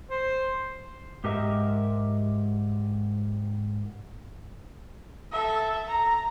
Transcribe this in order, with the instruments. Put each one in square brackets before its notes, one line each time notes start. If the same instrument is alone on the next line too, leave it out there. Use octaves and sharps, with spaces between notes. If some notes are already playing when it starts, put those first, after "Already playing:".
[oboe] C5
[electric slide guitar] G#2 G4 A#4 D#5 E5
[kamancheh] A4 E5
A#5